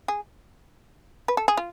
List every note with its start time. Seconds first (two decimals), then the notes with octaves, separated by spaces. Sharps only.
0.08 G#4
1.28 B4
1.37 A4
1.48 G#4
1.57 F4